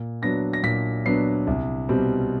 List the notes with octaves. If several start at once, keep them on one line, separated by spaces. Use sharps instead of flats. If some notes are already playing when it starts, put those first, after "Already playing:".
Already playing: A#2
F#3 B3 D4 A#6
A#6
A#2 B6
F#3 B3 D4 C7
C2
B2 G3 C4